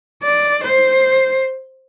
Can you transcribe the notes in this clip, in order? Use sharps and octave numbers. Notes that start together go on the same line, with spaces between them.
D5
C5